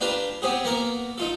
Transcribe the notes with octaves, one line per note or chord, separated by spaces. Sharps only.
D4 F4 G4 B4 A5 A#5
B3 C4 G4 G#4
A#3 B3 A#4 A#5
D#4 F4 A4